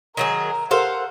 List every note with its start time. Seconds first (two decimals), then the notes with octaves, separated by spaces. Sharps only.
0.17 D#3 F#3 G#4 A#4
0.71 G4 A4 A#4 C5 F5 F#5